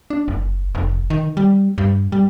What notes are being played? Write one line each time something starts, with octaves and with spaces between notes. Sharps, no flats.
D4
F#1
F1
D#3
G3
G2
G3